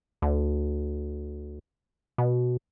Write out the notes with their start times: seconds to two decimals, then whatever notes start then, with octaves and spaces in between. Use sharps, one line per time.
0.22 D2
2.18 B2